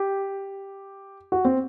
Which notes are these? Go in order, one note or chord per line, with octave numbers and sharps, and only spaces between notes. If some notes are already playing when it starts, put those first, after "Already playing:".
Already playing: G4
F#4
C4